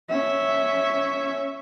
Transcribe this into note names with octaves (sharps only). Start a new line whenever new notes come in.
C#4 E5